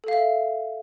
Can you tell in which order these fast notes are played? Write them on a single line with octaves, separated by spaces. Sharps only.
A4 F5 E5